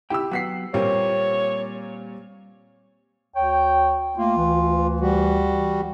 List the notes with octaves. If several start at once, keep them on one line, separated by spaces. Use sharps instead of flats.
C3 E4 G4 G5 E6
F#3 B3 F#5 B6 C7
A#2 G3 A#3 C4 C#5
D2 C#5 G5
A3 A#3 F4
D2 E3
G3 F#4